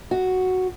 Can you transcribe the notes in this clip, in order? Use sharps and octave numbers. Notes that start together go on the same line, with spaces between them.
F#4